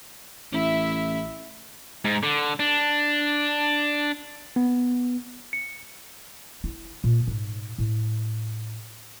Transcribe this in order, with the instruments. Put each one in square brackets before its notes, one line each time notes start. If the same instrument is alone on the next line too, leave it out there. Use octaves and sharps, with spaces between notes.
[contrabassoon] A1 [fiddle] E4 E5
[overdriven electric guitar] G#2
D3
D4
[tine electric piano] B3
C#7
[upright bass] E4
A#2
G#2
A2